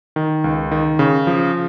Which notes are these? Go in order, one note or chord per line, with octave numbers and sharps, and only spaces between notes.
D#3
C#2
D#3
C#3
F3